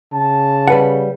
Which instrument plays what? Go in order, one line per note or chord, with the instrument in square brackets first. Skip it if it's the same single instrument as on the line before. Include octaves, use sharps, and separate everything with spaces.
[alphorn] C#3 [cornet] A5
[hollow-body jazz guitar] G3 B4 F#5